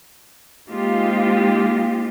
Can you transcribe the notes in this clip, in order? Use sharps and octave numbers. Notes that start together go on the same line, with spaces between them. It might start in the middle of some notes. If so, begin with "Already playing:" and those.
G#3 A#3 C4 D#4 F4 G4